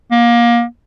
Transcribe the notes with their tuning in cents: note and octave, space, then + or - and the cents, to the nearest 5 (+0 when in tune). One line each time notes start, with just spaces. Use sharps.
A#3 +25